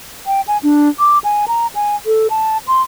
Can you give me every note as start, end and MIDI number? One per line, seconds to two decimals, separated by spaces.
0.27 0.41 79
0.48 0.58 80
0.63 0.89 62
0.99 1.19 86
1.24 1.46 80
1.48 1.67 82
1.75 1.96 80
2.06 2.27 69
2.30 2.58 81
2.67 2.82 84